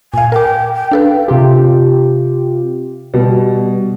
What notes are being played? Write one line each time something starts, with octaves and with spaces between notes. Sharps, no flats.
A#2 F5 G#5
A#4 G5 D6
G5
D4 A4 B4 F5
C3 F4 G4
B2 G3